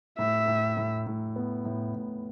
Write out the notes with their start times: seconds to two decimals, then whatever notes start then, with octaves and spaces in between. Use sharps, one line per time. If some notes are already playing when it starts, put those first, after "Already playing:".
0.18 A2 E5
0.48 A2
0.77 A2
1.07 A2
1.36 B3
1.65 A2
1.95 A2